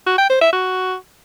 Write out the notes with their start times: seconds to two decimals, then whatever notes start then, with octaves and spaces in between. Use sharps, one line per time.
0.07 F#4
0.18 G5
0.30 C5
0.41 E5
0.53 F#4